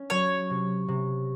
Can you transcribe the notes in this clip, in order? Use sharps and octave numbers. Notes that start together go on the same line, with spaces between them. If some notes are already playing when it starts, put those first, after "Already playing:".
Already playing: C#4
F#3 C#5
C3
C3